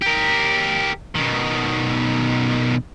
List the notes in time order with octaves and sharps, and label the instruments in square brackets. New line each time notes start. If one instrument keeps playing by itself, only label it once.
[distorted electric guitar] G4 A#4
B2 D#3